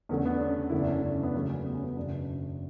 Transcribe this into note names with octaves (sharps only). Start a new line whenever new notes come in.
E2 D3 A3 C#4
B3
D4
C#4
F#1 E2 D3 A3 E4
D4
C#4
D4
B3
E2 C#3 F#3 A3 C#4
C#4
B3
C#4
B3
F#1 E2 B2 D4